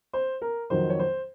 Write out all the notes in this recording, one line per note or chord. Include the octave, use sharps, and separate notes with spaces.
C5
A#4
F2 D#3 F#3 C5
C#5
C5